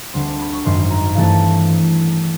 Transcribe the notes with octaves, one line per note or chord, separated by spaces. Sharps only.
D2 D3 G3 C4 C6
B5
C#6
G#1 F#2 D#3 G#3 C6
A#5
G2 E3 A3 C4 A5